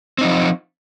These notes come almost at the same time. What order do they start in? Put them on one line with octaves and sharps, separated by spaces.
C4 D#4 F3